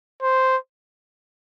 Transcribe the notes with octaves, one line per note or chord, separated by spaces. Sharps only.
C5